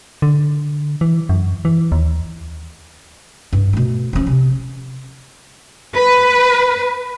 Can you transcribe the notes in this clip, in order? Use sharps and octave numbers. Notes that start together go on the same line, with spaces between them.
D3
E3
F#2
E3
D#2
G2
B2 A3
F3 C#4
C3
B4